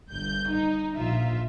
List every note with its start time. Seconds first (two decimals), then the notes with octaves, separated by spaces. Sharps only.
0.12 G1 G6
0.50 D#4
0.95 A#1 D#4 F4 E5